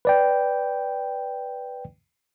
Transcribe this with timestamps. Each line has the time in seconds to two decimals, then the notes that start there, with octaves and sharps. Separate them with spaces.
0.05 B4 D5 G5